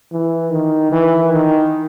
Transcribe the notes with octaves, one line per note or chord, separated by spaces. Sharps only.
E3
D#3
E3
D#3